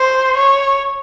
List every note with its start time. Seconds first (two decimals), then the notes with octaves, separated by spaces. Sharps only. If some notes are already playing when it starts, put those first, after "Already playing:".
Already playing: C5
0.37 C#5